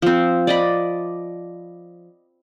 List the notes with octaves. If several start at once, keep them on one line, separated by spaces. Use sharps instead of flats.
F3 C4
D5 D#5 B5